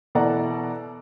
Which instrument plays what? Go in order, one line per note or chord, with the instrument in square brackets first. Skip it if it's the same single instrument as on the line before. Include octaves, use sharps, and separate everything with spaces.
[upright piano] B2 E3 A4 D5 F#5 A#5